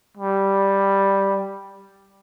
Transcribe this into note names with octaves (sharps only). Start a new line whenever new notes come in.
G3